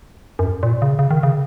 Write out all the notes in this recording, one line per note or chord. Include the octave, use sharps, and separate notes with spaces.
F#2
A#2
C#3
C#3
D#3
C#3